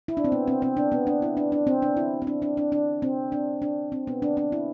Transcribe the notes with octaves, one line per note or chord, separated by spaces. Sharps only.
E4
D4
C4
B3
C4
C4
D4
B3
D4
E4
D4
D4
C4
D4
E4
C4
D4
D4
D4
D4
C4
D4
D4
C4
B3
D4
D4
E4